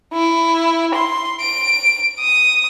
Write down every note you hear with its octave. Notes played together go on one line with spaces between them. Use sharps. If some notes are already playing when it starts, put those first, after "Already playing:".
E4
C6
D7
D#6